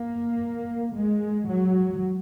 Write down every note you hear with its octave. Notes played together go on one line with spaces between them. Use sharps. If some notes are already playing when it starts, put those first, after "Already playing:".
Already playing: A#3
G#3
F#3